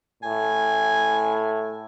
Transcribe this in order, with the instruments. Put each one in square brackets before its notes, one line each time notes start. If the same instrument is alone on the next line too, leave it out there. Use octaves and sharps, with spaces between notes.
[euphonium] A2 [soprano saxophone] G#5